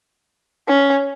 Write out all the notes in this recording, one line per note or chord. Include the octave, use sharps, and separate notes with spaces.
C#4